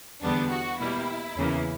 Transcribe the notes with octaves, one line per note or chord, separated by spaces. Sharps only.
E2 D3 G3 B3 D4
F#4
B2 G3 A#3 E4
E2 C#3 E3 A#3